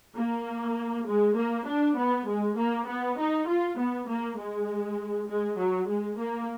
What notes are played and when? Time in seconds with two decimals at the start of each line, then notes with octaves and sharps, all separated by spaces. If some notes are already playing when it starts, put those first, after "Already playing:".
0.16 A#3
1.07 G#3
1.36 A#3
1.66 D4
1.97 B3
2.27 G#3
2.57 A#3
2.87 B3
3.18 D#4
3.47 F4
3.77 B3
4.07 A#3
4.37 G#3
5.28 G#3
5.58 F#3
5.88 G#3
6.18 A#3